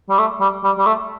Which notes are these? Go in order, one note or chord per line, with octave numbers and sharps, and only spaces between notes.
G3
A3
G3
G3
G3
A3